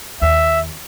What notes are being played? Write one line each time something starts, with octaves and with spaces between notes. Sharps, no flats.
D#2 E5